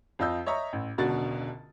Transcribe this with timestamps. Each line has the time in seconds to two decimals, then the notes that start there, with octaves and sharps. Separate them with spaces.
0.19 F2 F4 D#5 E6 G6
0.46 C#5 D#5 E5 A#5 C#6
0.73 A1
0.98 E1 C#2 B2 D3 F#4 A6